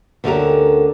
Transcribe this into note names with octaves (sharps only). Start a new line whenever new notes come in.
D2 D3 C#4 D#4 G4 A#4